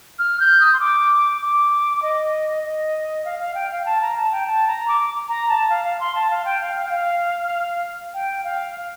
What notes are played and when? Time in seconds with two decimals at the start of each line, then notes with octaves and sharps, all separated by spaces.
0.19 F6
0.40 G6
0.60 D#6
0.73 C6
0.80 D6
1.41 D6
2.02 D#5
2.63 D#5
3.25 F5
3.40 F5
3.55 G5
3.70 F5
3.86 A5
4.02 A#5
4.17 A5
4.32 G5
4.47 A5
4.68 A#5
4.88 D6
5.29 A#5
5.49 A5
5.70 F5
5.85 F5
6.00 C6
6.15 A5
6.31 F5
6.45 G5
6.61 F5
6.76 F5
6.86 G5
6.92 F5
8.14 G5
8.44 F5